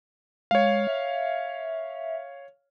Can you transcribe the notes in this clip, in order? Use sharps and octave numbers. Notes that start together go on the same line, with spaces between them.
G#3 C#5 F5
E5